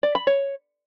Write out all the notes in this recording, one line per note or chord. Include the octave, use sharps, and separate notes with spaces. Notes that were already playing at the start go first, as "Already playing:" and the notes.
D5
B5
C#5